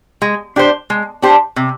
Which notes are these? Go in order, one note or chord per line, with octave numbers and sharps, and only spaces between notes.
G#3
D4 G4 C5
G#3
D4 G4 C5
C3